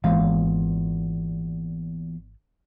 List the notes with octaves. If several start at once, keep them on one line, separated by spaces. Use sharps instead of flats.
G#1 E2 A#2 E3 G#3 F5